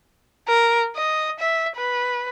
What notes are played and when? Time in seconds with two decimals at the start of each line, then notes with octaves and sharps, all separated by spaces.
0.48 A#4
0.96 D#5
1.39 E5
1.76 B4